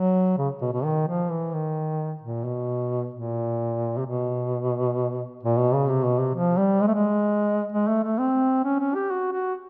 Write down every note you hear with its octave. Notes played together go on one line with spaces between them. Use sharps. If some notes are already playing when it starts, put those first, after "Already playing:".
Already playing: F#3
C#3
B2
B2
D#3
F3
E3
D#3
A#2
B2
A#2
C3
B2
A#2
B2
C#3
C3
B2
C3
F3
G3
G#3
A3
G#3
G#3
A3
A3
C4
C#4
C#4
G4
F#4
F#4